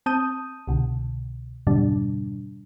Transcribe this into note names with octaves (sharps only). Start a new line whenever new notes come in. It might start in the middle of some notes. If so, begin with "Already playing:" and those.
C4 A5 D#6 G6 D#7
C2 B2 D3
F2 G#2 B2 D3 G3 D4